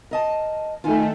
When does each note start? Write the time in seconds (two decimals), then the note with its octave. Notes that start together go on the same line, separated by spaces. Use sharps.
0.11 A#4 D#5 A5
0.84 D#3 A3 F4 G#5